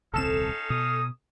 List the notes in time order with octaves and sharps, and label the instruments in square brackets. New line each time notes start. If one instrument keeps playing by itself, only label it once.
[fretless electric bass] D#1 C2 C4 [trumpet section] C#4 D#4 F5 [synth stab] A4 E7
[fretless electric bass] B2 [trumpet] D#6